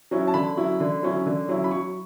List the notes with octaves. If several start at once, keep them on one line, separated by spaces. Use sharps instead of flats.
F#3 C#4 E4
A5
D3 B5
F#3 C#4 E4
D3
F#3 C#4 E4
D3
F#3 C#4 E4
B5
F#3 C#6